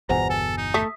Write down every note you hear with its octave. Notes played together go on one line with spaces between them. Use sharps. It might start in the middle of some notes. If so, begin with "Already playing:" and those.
G1 E2 B2 C5 F#5 G#5 A#5
A4 G#5
D#4
A3 D#6 B6